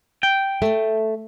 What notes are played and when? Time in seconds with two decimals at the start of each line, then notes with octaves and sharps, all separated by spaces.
0.23 G5
0.62 A3